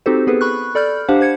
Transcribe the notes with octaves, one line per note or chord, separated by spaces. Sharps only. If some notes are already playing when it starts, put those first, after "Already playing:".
C4 D#4 F#4 G4 A4 C5
B3 G#4 A4 B4
B5 C#6 F#6
A4 D5 B5 F6 G6
D4 G4 C5 F5 F#5
C5 G#6 C#7